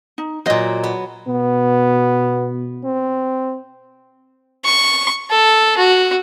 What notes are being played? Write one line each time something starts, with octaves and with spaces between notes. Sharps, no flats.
D#4
A#2 F#3 C5 D#5
B3
B2 B3
C4
C#6
A4
F#4